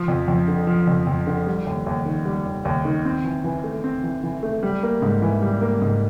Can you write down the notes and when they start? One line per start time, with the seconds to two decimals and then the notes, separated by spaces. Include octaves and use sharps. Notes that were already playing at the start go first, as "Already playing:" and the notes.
Already playing: F3
0.08 F2
0.28 F2
0.48 D3
0.67 F3
0.87 F2
1.07 F2
1.27 D3
1.47 G3
1.66 D#2
1.86 D#2
2.05 D#3
2.25 G3
2.45 D#2
2.65 D#2
2.85 D#3
3.05 C4
3.24 E3
3.44 E3
3.64 A3
3.84 C4
4.04 E3
4.23 E3
4.43 A3
4.63 G3
4.83 A#3
5.02 G#2
5.22 E3
5.42 G3
5.61 A#3
5.81 G#2